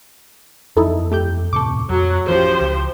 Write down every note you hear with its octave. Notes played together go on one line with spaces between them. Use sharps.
F2 E3 D#4 E4 A4
A3 G4 G6
D#1 A2 C3 A4 C#6 D6
F2 F#3
E3 F3 C#4 G4 C5
C#2